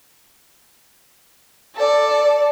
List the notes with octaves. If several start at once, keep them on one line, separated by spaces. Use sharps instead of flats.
A4 D5